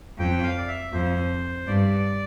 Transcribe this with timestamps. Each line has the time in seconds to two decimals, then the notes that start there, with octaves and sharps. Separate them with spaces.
0.18 F2 G5
0.43 F5
0.58 D5
0.68 E5
0.93 F2 C5
1.67 G2 D5